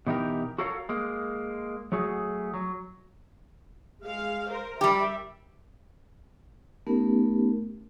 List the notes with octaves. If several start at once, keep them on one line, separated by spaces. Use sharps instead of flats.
B2 E3 D#4 F#4 G4 A#4
F#4 A4 A#4 C#5 F5
G#3 A#3
F#3 A3 F#4 G#4
F#3
G#3 F5
A#4 C5
G3 G4 E5
A3 B3 C#4 D#4 G4 A#4